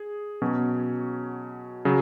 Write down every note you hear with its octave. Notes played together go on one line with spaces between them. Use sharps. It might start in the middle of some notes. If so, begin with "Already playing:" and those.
Already playing: G#4
B2 F#3 C#4
C#3 F#3